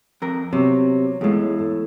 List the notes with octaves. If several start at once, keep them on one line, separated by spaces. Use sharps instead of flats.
F2 A#4
C3 F#3 B3
E2 A2 G#3 A3 F4
A3